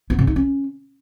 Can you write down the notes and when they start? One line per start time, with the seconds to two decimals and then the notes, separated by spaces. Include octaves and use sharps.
0.10 B3
0.19 C#3
0.27 D#4
0.36 C#4